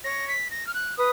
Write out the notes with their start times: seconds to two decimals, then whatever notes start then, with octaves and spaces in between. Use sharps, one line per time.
0.04 C#5 A#6
0.28 B6
0.50 A#6
0.67 F6
0.74 F#6
0.97 B4 D#6